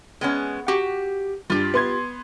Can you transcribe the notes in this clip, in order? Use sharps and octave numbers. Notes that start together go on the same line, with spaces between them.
G#3 B3 C#4
F#4 G4
G2 F4 G4
B3 C6 G#6